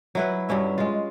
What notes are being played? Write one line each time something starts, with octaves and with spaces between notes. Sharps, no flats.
F#3 E4 B4
G2 F#3 C#4 E5
G#3 F4